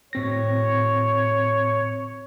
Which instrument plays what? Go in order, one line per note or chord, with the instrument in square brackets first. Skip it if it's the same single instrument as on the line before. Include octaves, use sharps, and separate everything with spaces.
[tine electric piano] A2 C4 A#6 [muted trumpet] C#5